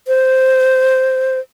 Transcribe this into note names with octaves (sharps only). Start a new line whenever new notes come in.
C5